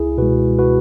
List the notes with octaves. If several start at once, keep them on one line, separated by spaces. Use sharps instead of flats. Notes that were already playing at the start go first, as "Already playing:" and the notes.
Already playing: C#2 E4 G#4
B2 G#3 F#4 B4
F#4 B4